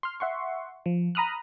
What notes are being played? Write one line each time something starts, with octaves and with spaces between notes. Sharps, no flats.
C6 F6
E5 F#5 C6 C#6
F3
A#5 B5 D#6 F6 F#6